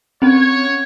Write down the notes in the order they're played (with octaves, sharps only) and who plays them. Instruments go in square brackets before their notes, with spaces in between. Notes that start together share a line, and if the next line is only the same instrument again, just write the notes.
[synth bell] C4 C#4 [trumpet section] C#5